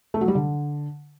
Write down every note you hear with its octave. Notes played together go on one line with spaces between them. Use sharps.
A3
F#3
G3
D3